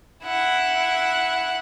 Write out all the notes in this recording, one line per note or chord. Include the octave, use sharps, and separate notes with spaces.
E4 F#5